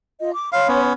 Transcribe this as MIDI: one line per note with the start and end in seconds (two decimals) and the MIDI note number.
0.18 0.30 65
0.18 0.30 75
0.33 0.50 86
0.52 0.82 73
0.52 0.68 77
0.52 0.82 83
0.52 0.82 84
0.68 0.93 59
0.68 0.93 61